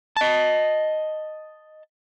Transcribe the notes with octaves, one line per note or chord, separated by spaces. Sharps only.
D#5 A5